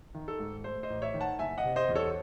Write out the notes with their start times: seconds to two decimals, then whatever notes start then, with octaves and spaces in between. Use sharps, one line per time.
0.15 D#3
0.28 A4
0.40 G#2
0.64 A3 C5
0.83 C5 D#5
0.90 A1
1.02 C#5 E5
1.14 D#3
1.20 F#5 A5
1.39 F#1 E5 G#5
1.58 D#5 F#5
1.64 C3
1.76 C5 D#5
1.89 E2
1.95 A4 C#5